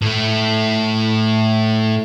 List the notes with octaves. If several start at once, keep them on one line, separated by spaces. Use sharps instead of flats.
A2 A3